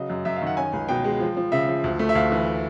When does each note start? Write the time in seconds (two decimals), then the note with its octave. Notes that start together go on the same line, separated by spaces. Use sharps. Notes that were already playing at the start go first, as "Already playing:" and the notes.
Already playing: C#3 F#3 D#5
0.10 F#2
0.25 F#2 E5
0.36 F5
0.42 D#3 F#5
0.57 C#4 G#5
0.73 C#2
0.89 B2 G5
1.04 G#3
1.20 F3
1.37 F3
1.52 C#3 E5
1.68 F3
1.84 D2
1.99 A3
2.09 E5
2.15 D2 F5
2.31 E3